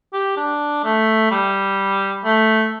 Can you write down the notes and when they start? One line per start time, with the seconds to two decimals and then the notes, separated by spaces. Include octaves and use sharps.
0.13 G4
0.37 D4
0.84 A3
1.31 G3
2.24 A3